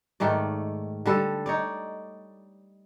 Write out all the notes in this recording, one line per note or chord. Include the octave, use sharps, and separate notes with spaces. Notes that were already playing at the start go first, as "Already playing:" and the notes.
G#2 D#3 A3 D5
D3 G3 A4
D#4 C#5 D5